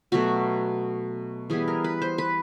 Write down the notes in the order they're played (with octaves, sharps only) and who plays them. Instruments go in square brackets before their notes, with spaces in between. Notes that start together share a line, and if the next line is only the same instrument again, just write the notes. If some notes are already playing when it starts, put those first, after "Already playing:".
[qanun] B2 F#3 A3 F#4
E3 G3 B3 G#4
A#4
B4
C5
B4